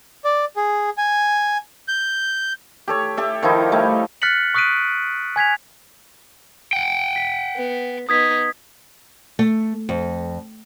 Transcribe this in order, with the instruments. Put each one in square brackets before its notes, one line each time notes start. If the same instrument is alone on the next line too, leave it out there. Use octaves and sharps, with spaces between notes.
[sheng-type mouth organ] D5
G#4
G#5
G6
[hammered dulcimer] G4 A4 C#5
G4 A4 E5
D#3 F3 D#4 E4
G3 A3 D#4 C#5
[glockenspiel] F6 F#6 A6 B6 C#7 F#7
C#6 D#6 F#6 B6 D7 D#7
G#5 G#6 B6 F7
[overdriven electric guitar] F#5 G5
[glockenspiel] B6
[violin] B3
[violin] B3 D#4 [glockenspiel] D#6 G#6 B6
[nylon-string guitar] A3
F2